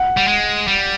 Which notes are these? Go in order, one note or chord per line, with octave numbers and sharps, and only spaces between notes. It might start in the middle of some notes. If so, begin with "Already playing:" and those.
Already playing: F#5
G3
G#3
G3